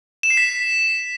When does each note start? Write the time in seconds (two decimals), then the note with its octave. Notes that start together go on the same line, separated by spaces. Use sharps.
0.23 E7
0.30 C7
0.37 B6